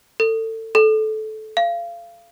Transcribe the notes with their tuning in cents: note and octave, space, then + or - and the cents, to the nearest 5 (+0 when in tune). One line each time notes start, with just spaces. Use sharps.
A4 +25
A4 -20
F5 -25